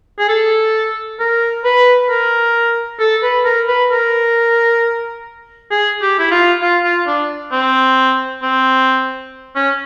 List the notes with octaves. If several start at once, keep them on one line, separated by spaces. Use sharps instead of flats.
G#4
A4
A#4
B4
A#4
A4
B4
A#4
B4
A#4
G#4
G4
E4
F4
F4
F4
D4
C4
C4
C#4